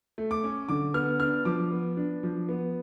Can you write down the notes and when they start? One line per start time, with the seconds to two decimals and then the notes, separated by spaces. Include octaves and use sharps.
0.18 A3
0.31 D6
0.44 C#4
0.69 D3 D6
0.94 B3 F6
1.20 D4 F6
1.45 F3 D6
1.71 B3
1.97 D4
2.23 F3
2.49 B3